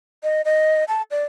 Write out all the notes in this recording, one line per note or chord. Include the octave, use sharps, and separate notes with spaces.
D#5
D#5
A5
D5